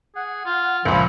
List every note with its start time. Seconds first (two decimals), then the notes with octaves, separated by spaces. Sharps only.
0.15 G#4 F#5
0.45 F4
0.85 C#2 A#2 F3 E5 B5